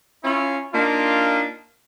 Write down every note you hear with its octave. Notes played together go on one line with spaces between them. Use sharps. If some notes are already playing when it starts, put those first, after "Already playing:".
C#4 E4 F4
A#3 D4 D#4 F4